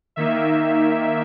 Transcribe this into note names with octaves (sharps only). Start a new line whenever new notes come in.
D#3 A#3 D#4 E5